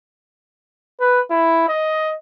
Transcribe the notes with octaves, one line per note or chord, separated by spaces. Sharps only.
B4
E4
D#5